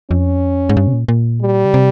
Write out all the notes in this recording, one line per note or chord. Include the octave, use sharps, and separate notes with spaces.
F2 C#4
G#2
G2
C3
A#2
A#2
G3
C#3
C3